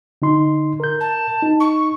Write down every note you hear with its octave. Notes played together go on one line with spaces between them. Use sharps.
D3 D#4 C6
A#4 G6
A5
D#4
C#6